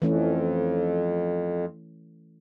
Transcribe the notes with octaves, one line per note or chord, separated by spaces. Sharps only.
F2 E3 A3 C#4